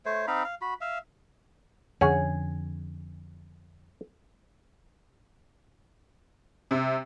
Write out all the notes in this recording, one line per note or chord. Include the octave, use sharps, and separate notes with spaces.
A3 C5 C#5
C4 D#4 F5 B5
F5
F#4 B5
E5 F5
F2 D3 C#4 G#4 F#5
C3